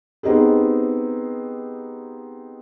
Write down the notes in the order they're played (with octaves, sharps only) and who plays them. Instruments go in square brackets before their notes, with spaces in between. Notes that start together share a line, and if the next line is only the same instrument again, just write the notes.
[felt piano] B3 C4 D#4 G4 G#4